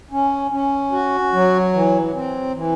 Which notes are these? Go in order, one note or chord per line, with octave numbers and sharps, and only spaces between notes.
C#4
C#4
F#4
F#3
E3
C4
E3